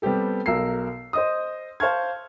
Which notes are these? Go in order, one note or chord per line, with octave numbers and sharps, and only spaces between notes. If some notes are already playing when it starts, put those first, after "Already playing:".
G3 B3 C4 G4 A4
B1 A#4 E6 C7
C5 D#5 D#6
C5 F5 A5 C#6 F6 G#6